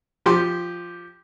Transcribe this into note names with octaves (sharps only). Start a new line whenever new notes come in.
F3 G4 C6